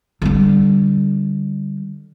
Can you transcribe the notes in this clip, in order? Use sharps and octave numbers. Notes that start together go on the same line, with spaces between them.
D3 G3